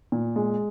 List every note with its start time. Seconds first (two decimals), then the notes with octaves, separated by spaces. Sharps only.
0.12 A#2
0.36 G#3